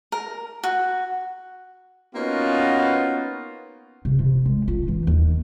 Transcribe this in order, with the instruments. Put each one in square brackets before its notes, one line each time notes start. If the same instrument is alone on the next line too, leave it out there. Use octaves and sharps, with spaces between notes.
[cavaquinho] A#4
F#4
[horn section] A#3 B3 C#4 D#4 F4 F#4
[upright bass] C3
C3
G#3
F4
E3
D#2